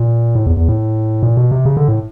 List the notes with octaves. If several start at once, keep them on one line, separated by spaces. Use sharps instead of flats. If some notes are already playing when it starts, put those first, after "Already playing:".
Already playing: A#2
A2
E2
E2
A2
A#2
B2
C3
C#3
D3
A2